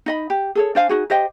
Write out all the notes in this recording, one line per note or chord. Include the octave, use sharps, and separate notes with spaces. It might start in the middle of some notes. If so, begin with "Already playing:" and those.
D#4 D#5 B5
G4
G#4 A4 C#5
D4 C5 F5 G#5
D#4 F#4 G#4
G4 C5 D#5 G5